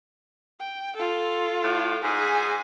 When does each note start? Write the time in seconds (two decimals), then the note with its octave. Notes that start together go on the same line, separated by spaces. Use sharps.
0.60 G5
0.96 F4 A4
1.64 A2
2.03 G#2 G#4 G#5